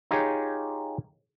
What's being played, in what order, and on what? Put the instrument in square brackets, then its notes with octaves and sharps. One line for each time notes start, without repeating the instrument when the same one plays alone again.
[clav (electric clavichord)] D#4 F4 G4 G#4 C#5